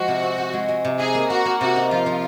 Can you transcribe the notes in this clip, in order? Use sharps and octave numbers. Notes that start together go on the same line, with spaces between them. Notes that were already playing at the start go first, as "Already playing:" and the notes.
Already playing: F3 G#3 F#4
C3
C4
C4
G#3
G#3
C3
D#4 G#4
A#3
A#3 F#4
A#3
C3 F#4
D#4
F3 F4
F3